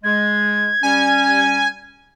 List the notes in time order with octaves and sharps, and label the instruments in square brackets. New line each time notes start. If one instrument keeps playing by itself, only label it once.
[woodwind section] G#3 [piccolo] G#6
[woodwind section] G3 C#4 [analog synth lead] G#5